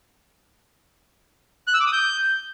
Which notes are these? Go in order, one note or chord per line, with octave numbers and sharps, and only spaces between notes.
F#6
E6
D6
D#6
G6